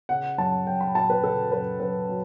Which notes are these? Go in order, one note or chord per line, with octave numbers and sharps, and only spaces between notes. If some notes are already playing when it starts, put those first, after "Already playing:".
C#3 F#5
F#2 A5
F#2 G5
B5
F#3 A5
B4
C#3 A4
F#2 B4
F#2 B4
F#3